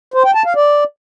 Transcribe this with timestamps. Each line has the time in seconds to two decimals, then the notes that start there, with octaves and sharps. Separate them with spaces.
0.14 C5
0.24 G5
0.35 A5
0.45 F5
0.56 D5